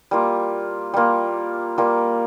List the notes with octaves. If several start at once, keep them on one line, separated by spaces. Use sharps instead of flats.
G3 A#3 F4
G3 A#3 F4
G3 A#3 F4